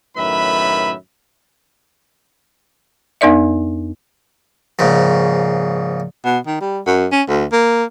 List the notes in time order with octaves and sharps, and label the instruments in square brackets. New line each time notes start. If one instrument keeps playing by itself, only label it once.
[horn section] F#2 A2 D#3 B4 E5 B5
[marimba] F2 B3 D#4 A#4 D5 E5
[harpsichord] A#1 G#2 C#3
[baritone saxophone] B2
D#3
G3
F#2
C#4
D2
A#3